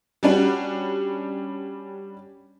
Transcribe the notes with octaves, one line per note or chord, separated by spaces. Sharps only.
G3 C#4 D4 F#4